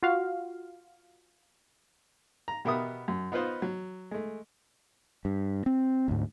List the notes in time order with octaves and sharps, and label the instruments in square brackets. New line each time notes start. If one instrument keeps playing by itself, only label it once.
[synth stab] F4 F#4 F5
[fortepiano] A#5
B2 B3 G4 A#4 E5 D#6
F#2
B3 D#4 F4 B4 C5 D#5
F#3
G#3 A3
[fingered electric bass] G2
C4
D2 G#2